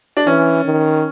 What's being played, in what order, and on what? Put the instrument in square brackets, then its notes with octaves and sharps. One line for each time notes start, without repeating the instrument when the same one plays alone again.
[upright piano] D4
[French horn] E3 [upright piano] C#4
[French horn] D#3